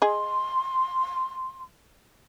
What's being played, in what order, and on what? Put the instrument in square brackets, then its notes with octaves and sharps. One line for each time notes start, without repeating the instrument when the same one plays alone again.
[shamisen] G#4 D#5 [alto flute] C6